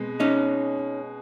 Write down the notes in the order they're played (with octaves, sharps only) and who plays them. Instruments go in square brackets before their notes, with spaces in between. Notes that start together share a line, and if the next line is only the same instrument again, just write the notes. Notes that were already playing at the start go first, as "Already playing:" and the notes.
Already playing: [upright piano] B2 G#3 C4
[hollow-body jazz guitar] C#4 D#4